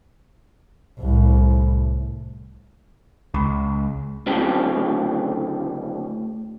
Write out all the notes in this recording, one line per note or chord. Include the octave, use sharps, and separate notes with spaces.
C2 A2
C#2
D2 A2 C#3 F#3 C4